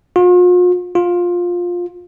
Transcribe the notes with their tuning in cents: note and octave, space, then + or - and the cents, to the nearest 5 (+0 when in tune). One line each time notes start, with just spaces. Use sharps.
F4 +45
F4 +15